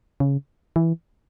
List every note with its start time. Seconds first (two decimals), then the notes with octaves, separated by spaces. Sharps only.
0.20 C#3
0.76 E3